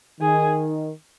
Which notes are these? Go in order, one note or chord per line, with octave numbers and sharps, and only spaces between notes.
D#3 G#4